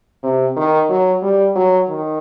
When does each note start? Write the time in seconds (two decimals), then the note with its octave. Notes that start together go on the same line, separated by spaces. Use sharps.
0.23 C3
0.56 D#3
0.89 F#3
1.22 G3
1.55 F#3
1.88 D#3